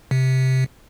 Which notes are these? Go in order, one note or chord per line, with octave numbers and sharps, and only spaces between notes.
C3